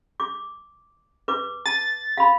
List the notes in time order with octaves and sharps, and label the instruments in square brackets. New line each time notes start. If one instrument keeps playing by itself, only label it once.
[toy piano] D6
B4 D6
[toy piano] A5 [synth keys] A6
[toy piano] F5 B5